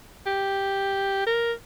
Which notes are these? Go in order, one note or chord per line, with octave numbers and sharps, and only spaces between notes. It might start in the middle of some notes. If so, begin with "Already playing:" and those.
G4
A#4